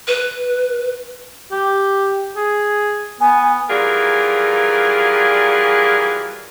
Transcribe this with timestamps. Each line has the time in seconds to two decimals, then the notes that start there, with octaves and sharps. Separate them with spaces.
0.08 B4
1.52 G4
2.36 G#4
3.21 B3 G#5
3.70 E3 F#3 G3 F4 G#4 A#4